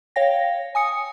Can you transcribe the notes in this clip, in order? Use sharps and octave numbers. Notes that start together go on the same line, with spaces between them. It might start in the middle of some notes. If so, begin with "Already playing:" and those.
C#5 F5 G5 A#6
G#5 D#6 C#7